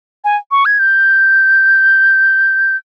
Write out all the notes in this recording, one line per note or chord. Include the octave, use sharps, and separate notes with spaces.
G#5
C#6
G#6
G6